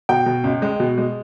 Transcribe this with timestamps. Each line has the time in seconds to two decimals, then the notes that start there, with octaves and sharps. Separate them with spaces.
0.09 B2 G5
0.26 B2
0.44 C#2
0.62 G#3
0.80 B2
0.98 G#3